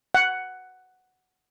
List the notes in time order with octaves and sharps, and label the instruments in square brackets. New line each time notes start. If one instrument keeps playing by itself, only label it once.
[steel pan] F#5